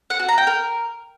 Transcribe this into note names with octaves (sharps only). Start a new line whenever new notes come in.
F#5
F#4
A#5
G5
A#4